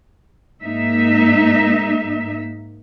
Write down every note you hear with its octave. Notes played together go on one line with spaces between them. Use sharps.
G#2 A#3 D#4 E5